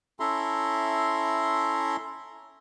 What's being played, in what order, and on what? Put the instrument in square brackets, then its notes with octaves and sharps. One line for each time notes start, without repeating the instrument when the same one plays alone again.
[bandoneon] C#4 E4 A4 E5 A#5 C6